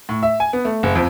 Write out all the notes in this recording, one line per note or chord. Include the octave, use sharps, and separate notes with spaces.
A2
E5
G#5
B3
A3
F#1
F2